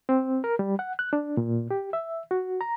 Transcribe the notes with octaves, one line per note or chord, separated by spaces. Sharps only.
C4
A#4
G3
F#5
F#6
D4
A#2
G4
E5
F#4
A#5